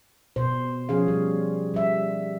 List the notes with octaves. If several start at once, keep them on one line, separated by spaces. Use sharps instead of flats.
B2 C5
F3 C#4 G#4 F5
G3
G3 E5